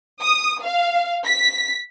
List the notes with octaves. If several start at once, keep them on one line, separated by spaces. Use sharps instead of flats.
D#6
F5
B6